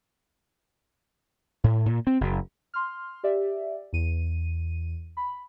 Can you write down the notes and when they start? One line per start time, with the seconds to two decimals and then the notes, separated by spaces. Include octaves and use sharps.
1.64 A2
1.86 A#2
2.07 C4
2.21 F#1
2.74 C6 F6
3.23 G4 D5 E5
3.93 E2 D#7
5.17 B5